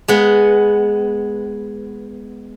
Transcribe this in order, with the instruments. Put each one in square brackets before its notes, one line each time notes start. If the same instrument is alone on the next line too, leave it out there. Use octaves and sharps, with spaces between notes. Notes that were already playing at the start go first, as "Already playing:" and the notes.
[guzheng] G#3 B3